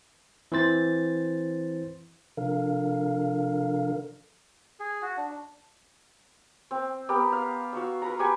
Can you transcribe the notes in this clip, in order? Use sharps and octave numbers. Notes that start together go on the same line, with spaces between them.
E3 C4 C5 A6
C3 F3 D4 A4 A#4 F5
G#4
F#4
D4
C4
B3 G4 A#4
F5
F#4 F5 C#6 E6
A#4 B4 A#5
G4 B4 G#5 C#6